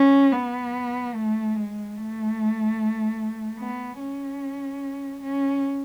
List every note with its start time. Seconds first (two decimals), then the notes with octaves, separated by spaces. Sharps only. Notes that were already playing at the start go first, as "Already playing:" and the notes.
Already playing: C#4
0.32 B3
1.15 A3
1.55 G#3
1.96 A3
3.58 B3
3.99 C#4
5.22 C#4